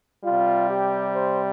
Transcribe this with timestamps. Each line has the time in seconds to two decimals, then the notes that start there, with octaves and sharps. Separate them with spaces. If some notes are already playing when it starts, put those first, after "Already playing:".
0.24 C3 G3 F4
0.69 G4
1.13 C5